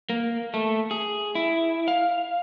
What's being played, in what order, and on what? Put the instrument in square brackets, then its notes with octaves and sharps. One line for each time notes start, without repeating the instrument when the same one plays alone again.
[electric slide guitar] A#3
A3
G#4
E4
F5